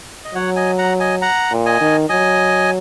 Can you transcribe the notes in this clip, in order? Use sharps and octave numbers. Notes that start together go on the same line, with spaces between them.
D#5
F#3 C#5 F#5
D#5 G#5
F#5 A#5
D#5 G#5
F#5 A#5
A#2
D#5 G#5
D#3
F#3 D#5 G#5